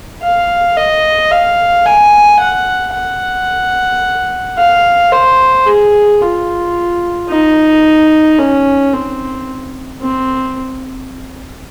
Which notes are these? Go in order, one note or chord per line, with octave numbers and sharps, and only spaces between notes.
F5
D#5
F5
G#5
F#5
F#5
F5
C5
G#4
F4
D#4
C#4
C4
C4